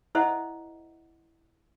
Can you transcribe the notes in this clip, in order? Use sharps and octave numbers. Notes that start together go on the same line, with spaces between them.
E4 A4 C5 D#5 E5 F#5